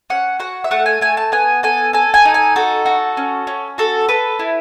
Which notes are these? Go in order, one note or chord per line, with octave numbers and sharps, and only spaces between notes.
C#4 F#5
F#4 F#5
E5
A3 F#5
G#5
A3 G#5
A5
B3 G#5
A4 G#5
A4 G#5
G#5
D#4
G#5
F#4 A4
F#4
C#4
C#4
F#4 A4
A4 B4
E4